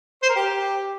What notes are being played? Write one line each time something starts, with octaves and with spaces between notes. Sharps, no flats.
C5
A#4
G4